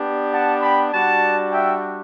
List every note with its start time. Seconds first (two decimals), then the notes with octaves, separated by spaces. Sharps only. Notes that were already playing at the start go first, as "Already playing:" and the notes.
Already playing: B3 D4 G4
0.32 F#5 A5
0.62 G5 B5
0.92 G3 D4 F#4 F#5 A5
1.52 E5 G5